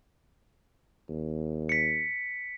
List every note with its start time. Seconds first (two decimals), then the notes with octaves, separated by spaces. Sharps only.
1.09 D#2
1.69 B6 C#7